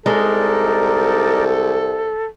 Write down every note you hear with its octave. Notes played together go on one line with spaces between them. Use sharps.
C2 G#3 D#4 A4 A#4 D5